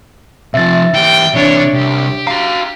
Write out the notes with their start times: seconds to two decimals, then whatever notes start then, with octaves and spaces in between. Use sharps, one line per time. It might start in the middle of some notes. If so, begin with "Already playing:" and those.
0.54 C3 F3 E5 A6
0.94 E3 G4 G5
1.35 C3 E3 D4 C#5
1.73 C2 G4
2.27 F#4 F5 A#5